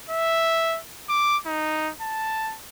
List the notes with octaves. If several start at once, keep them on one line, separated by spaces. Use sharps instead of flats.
E5
D6
D#4
A5